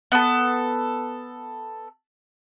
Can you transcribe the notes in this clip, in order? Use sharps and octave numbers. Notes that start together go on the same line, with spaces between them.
B3 A4